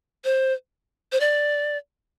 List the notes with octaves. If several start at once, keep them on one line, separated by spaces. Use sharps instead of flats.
C5
C5
D5